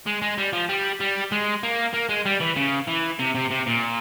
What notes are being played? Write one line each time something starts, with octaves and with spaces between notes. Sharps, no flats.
G#3
G#3
G3
F3
G3
G3
G#3
A#3
A#3
G#3
G3
E3
C#3
E3
C3
C3
C3
A#2